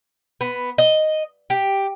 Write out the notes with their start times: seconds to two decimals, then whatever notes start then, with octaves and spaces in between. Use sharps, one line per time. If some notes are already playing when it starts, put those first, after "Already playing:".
0.41 B3
0.78 D#5
1.50 G4